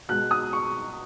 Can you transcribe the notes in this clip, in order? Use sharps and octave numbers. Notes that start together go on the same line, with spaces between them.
B2 G#3 F#6
D#6
C#6